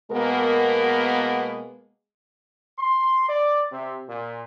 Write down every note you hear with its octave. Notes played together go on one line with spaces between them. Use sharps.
B2 G#3 A#3 B3 A#4
C6
D5
C3
A#2